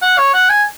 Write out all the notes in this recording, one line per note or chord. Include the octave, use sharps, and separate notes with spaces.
F#5
C#5
F#5
G#5